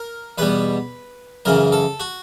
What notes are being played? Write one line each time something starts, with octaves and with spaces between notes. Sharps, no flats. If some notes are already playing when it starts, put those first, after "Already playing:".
Already playing: A#4
E2 B2 G3 B4
F#2 C#3 E3 A#4
A4
F#4